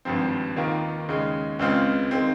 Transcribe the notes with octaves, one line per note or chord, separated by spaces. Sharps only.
G#1 G2 F3 C4
D#2 D#3 A#3 F4
D#2 C#3 G#3
C#2 C#3 G#3 C4 F4
D#3 G#3 C4